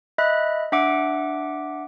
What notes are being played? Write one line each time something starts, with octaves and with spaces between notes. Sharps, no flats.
D#5 E5 B5 F#6
D4 E5 F#5 D6 D7